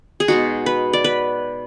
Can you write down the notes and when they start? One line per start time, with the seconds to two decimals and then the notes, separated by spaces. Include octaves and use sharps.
0.20 G#4
0.28 B2 G#3 D#4 F#4
0.66 B4
0.93 D5
1.04 B4